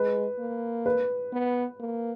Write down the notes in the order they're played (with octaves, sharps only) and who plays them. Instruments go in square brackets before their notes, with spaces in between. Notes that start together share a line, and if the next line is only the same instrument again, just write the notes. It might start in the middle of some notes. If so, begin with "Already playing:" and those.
Already playing: [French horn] G#3 [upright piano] B4
[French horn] A#3
[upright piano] B4
[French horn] B3
A#3